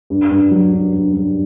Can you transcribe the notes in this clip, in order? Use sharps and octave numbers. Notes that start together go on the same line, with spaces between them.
G2
G2
F#3
G2
G2
G2